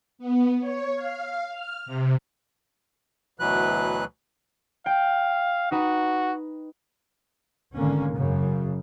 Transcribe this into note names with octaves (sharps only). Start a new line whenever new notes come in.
B3
C#5
F5
F6
C3
D2 B2 E3 F#3 B4 F#6
F5 G5
D#4 F#4 B4
G#1 D3 A#3 C#4
F#2 C#3